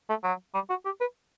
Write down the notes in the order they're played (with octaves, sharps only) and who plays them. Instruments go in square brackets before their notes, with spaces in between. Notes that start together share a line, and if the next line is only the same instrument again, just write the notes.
[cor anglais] A3
F#3
G3
F#4
G4
B4